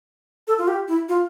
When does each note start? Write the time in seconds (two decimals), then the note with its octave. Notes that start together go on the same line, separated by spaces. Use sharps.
0.47 A4
0.58 F4
0.68 G4
0.88 E4
1.09 F4